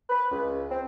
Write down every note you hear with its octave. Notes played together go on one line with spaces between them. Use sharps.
B4
C#2
C4